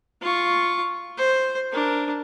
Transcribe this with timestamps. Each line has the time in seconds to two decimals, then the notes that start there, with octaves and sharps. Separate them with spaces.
0.22 F4 C#6
1.18 C5
1.72 D4 A#4